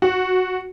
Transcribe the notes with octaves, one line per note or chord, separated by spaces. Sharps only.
F#4